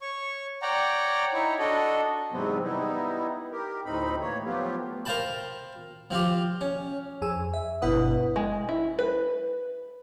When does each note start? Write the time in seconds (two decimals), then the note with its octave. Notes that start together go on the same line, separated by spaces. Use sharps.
0.02 C#5 C#6
0.62 C#5 D5 F#5 G5 A#5
1.33 D#4 E4 C#5
1.59 D4 F#4 A4 D#5
2.32 E2 G#2 C3 F#3 B3 C4
2.64 G3 B3 D#4 E4
3.52 G4 A#4
3.85 D2 A2 C4 D#4 B5
4.21 E3 A#3 C#5
4.45 F3 F#3 A3 B3 F4 G4
5.05 A#4 C5 F5 G5 A5 B5
6.11 F3 C4 F4 G4
6.61 C#4
7.22 F2 G#4 G#5 E6
7.54 E5
7.82 G1 B2 E4 B4 F#5 D#6
8.36 G#3
8.69 E4
8.99 B4